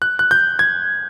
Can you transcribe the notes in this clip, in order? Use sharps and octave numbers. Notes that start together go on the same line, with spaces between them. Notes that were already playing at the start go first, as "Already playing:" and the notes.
F#6
F#6
G6
G#6